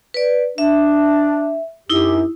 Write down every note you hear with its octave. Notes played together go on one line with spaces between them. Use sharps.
B4 D5
D4 E5
F#2 D#4 E4 G4